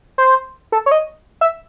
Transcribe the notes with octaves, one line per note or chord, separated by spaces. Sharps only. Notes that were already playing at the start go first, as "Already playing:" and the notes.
C5
A4
C#5
D#5
E5